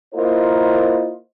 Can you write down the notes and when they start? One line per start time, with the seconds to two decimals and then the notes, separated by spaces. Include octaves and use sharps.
0.14 A#3 E4 F4 A#4 C5 D#5